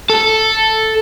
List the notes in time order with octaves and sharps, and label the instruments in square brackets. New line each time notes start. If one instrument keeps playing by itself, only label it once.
[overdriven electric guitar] A4